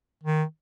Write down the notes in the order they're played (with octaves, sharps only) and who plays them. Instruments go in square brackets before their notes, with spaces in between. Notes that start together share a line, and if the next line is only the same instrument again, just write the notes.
[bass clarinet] D#3